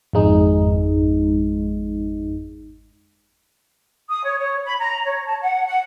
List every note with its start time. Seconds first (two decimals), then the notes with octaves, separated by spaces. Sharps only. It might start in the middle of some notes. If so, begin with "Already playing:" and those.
0.13 G#1 F2 G#3 D#4
4.08 D#6
4.23 C#5
4.38 C#5
4.64 B5
4.79 A#5
5.05 C#5
5.26 A5
5.40 F#5
5.66 F#5